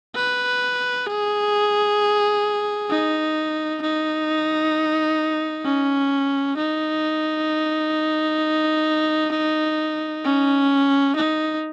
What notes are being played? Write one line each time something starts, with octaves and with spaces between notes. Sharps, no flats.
B4
G#4
D#4
D#4
C#4
D#4
C#4
D#4